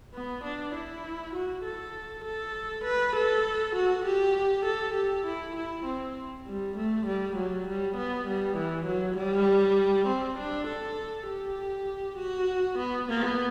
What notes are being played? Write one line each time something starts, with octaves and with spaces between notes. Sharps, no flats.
B3
D4
E4
F#4
A4
A4
B4
A4
F#4
G4
A4
G4
E4
E4
C4
G3
A3
G3
F#3
G3
B3
G3
E3
F#3
G3
C4
D4
A4
G4
F#4
B3
B3